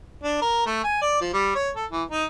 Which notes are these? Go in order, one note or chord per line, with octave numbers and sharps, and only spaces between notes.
D4
A#4
A3
G#5
D5
F3
G3
C#5
A4
E3
D#4